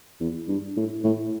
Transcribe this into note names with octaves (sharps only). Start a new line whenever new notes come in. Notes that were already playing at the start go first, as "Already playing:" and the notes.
E2
G2
A2
A2